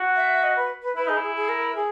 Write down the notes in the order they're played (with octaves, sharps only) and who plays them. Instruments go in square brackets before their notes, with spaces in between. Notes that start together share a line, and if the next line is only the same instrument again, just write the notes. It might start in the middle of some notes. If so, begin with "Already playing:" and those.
Already playing: [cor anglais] F#4
[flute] E5
D#5
B4
B4
[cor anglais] E4 [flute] B4
[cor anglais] D#4 [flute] G#4
[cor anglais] E4
[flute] G#4
G#4
A#4
G#4